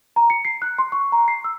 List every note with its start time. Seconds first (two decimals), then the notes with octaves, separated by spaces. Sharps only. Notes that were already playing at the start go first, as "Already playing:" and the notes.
0.16 A#5
0.30 C#7
0.45 C7
0.62 F#6
0.79 C6
0.92 C#6
1.12 A#5
1.28 C7
1.44 E6